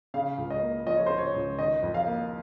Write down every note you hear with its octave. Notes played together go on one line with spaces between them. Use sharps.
C#3 F5
C#2
D#5
A#3
F3 D#5
C#5
C#3 C5
C#5
C#2
D#3 D#5
F2
F5
A#3